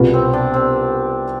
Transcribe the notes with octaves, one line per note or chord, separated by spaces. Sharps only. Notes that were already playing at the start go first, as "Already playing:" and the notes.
Already playing: C2 B2 B3 F4
C4
D4
C4